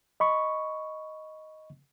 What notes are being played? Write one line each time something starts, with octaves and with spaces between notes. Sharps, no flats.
D#5 B5 C#6